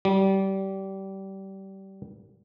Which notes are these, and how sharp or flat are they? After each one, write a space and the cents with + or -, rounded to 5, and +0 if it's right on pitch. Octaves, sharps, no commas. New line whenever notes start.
G3 -25